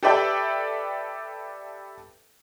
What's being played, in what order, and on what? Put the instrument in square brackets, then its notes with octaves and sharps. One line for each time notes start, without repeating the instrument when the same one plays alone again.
[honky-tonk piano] G4 A4 B4 D5 E5 G5